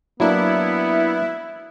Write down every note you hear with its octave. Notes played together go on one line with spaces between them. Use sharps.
F#3 A#3 B3 D4 E4